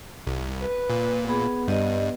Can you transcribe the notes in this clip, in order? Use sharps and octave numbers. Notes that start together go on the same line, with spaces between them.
C2
B4
A#2
B3 G#4 B5
G2 G4 D5 D#5